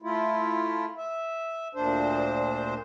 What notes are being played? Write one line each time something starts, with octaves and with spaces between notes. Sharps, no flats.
A3 E4 F4
E5
D2 A#2 D4 C5